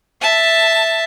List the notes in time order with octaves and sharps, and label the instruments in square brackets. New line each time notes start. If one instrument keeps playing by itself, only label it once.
[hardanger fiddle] E5 A5